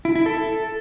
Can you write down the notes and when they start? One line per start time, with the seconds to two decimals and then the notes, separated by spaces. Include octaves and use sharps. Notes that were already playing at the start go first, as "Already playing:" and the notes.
0.05 E4
0.15 E4
0.26 A4